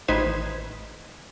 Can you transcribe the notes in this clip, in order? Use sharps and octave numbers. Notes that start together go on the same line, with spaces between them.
A1 D#3 D#4 B4 C5 G#6